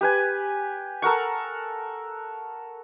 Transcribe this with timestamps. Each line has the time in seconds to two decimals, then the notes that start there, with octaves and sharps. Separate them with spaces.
0.01 G4 B4 G#5
1.02 A4 A#4 F#5 C#6